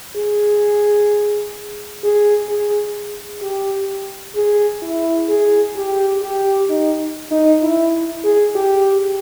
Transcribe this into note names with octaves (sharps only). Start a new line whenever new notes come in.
G#4
G#4
G#4
G4
G#4
E4
G#4
G4
G4
D#4
D#4
E4
G#4
G4